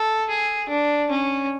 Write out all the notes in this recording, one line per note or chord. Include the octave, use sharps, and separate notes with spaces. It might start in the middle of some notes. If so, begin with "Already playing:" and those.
Already playing: A4
G#4
D4
C#4